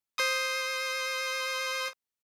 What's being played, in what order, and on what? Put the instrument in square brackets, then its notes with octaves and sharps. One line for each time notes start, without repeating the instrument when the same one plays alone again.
[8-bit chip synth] C5 C6 D#6